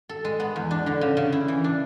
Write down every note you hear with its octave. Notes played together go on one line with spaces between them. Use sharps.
A4
G#3
B3
E2
D4
D3
C#3
C#3
E4
E3
D4